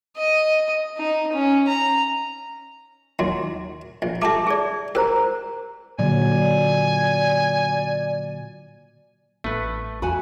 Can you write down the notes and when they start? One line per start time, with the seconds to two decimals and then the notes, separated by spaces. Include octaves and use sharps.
0.17 D#5
0.97 D#4
1.32 C#4
1.67 A#5
3.19 D#2 F#3 C6
4.02 A#1
4.22 A3 G4 E5 A5 D6
4.47 G#4 D5
4.95 G4 A#4 C5 A#5
5.99 A#2 D3 F#3 D5 G#5
9.44 A1 A3 B4
10.02 E2 F#4 G#5 B5